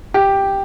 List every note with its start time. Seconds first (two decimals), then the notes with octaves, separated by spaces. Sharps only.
0.14 G4